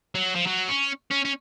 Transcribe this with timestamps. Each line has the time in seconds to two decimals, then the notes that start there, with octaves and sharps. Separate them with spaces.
0.15 F#3
0.35 F3
0.46 F#3
0.69 C#4
1.11 C#4
1.25 C#4